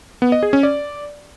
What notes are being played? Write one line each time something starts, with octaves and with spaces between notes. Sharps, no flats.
B3
D#5
G#4
C#4
D5